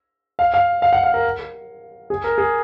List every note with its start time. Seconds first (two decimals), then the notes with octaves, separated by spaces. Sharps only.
0.39 F5
0.54 F5
0.82 F5
0.93 F#5
1.03 F5
1.14 A#4
2.10 G#4
2.24 A#4
2.38 G#4